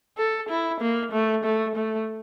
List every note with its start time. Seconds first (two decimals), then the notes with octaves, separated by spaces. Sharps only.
0.18 A4
0.50 E4
0.81 A#3
1.12 A3
1.45 A3
1.76 A3